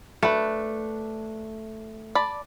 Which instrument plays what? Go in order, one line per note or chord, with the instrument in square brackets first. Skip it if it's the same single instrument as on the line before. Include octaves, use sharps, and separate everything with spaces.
[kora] A3 [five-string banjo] D4 B4
[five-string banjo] D5 A5 B5